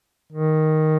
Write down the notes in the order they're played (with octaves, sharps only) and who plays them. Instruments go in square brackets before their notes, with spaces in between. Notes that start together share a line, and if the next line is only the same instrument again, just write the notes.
[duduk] D#3